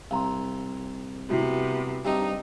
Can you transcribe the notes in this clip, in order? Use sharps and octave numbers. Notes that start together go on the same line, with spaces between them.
C2 F5 A#5 C6
C3 B3 E4 F#4 G4
G2 C3 G3 D#4